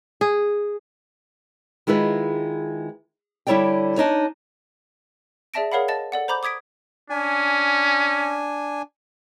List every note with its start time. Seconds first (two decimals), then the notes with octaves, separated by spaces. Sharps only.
0.21 G#4
1.87 D#3 G#3 E4 F4 B4
3.47 D3 G3 E4 C#5 D5 G5
3.97 D4 D#4 C#5
5.54 G#4 D5 E5 A5 A#6 D7
5.72 G#4 A#4 C#5 F5 F#5 B5
5.88 D#5 A5 A6
6.12 A4 D5 F#5
6.28 C5 A#5 B5 D6 G6
6.43 D6 D#6 G#6 B6 D7
7.10 C#4 D4 G#5